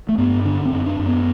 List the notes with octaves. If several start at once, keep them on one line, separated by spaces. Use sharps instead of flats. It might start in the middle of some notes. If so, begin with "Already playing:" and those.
A3
G2 B3
D3 D4
C4
F#2
D4
F#2 C4
B3